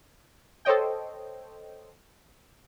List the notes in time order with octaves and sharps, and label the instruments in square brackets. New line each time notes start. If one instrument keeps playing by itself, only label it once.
[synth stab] A4 C5 C#5 D#5 G5